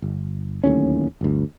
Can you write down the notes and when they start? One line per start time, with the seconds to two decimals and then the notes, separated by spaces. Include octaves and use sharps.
0.02 G1
0.64 D1 D#2 A2 C#4
1.21 G1 D2